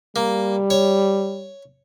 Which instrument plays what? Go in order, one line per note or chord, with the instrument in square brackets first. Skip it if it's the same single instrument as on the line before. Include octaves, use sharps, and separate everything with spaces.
[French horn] G3 [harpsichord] A#3
[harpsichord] C#5